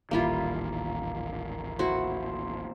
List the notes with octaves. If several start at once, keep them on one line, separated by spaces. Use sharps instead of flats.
D#1 A1 D#3 G3 A#3 E4 F4
E4 F#4 C5